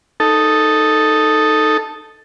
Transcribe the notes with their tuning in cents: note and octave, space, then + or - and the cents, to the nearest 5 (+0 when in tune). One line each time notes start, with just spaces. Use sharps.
D#4 +0 A4 +0